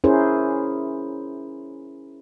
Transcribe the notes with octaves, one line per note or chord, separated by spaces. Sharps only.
C#4 E4 G#4 A#4 C5